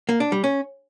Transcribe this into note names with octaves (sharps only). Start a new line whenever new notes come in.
A#3
D4
G3
C#4